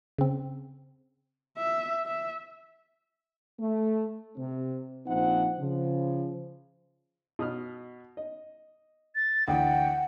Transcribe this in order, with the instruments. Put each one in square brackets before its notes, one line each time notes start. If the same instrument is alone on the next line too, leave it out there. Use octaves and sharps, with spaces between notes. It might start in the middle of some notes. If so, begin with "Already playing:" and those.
[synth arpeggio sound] C#3 C4
[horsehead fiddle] E5
E5
[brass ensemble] A3
C3 C4
A#1 F3 C4 D#4 F#5
C#3 F3
[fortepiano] B2 D#6 F6
D#5
[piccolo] A6
[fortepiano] D2 E3 [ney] F#5 [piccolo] G5